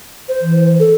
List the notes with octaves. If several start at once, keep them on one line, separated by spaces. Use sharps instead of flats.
C5
E3
A4